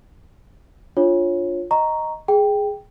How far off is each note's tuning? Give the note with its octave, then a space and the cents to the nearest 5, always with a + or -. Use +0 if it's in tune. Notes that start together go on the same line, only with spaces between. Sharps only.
D4 +0 F4 +5 C#5 -20
D#5 +0 A#5 +0 C#6 +0
G#4 +0 G5 +5